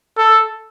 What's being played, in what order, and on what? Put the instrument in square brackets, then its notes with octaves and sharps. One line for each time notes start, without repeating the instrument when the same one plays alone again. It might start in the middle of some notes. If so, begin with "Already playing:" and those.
[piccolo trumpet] A4